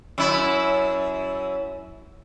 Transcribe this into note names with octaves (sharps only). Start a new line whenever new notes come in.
F#2 E4